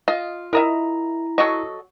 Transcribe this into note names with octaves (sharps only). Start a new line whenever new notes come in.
F4 D#5
E4 A#4 D#5 E5 A#5
F#3 F#4 A4 D#5 C#6